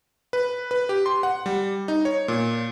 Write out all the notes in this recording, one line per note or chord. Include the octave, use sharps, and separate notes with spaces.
B4
B4
G4
C6
F#5
G3
D#4
C#5
A#2